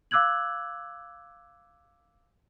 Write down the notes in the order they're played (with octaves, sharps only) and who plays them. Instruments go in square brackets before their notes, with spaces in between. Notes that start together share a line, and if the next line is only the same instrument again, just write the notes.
[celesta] F5 D6 E6 F#6 G#6 F#7